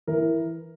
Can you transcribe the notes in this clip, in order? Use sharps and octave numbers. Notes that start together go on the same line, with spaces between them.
E3 A#4